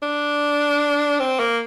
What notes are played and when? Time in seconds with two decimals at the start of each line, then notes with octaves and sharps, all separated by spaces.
0.02 D4
1.20 C4
1.39 A#3